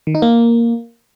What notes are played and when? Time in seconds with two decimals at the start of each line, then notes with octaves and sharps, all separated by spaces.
0.07 D#3
0.15 D#4
0.22 A#3